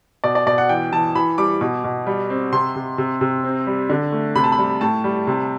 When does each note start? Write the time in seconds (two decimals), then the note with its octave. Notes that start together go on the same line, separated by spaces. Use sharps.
0.24 B2 D5
0.35 D5
0.47 B2 D5
0.58 F#5
0.69 E3 G5
0.93 E3 A5
1.15 E3 B5
1.38 G3 D6
1.61 B2
1.84 B2
2.07 G3
2.30 C4
2.52 C3 C6
2.76 C3
2.98 C3
3.21 C3
3.44 C4
3.67 G3
3.90 D3
4.12 A3
4.35 C3 B5
4.44 A5
4.52 B5
4.58 G3
4.81 A2 A5
5.04 G3
5.27 C3